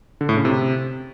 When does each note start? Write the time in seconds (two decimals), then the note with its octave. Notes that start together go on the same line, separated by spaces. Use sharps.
0.21 D3
0.29 A2
0.37 C#3
0.45 C3